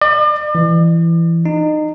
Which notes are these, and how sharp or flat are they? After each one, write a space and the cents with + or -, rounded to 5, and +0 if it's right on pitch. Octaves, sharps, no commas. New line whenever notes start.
D5 +40
E3 +15
D#4 -25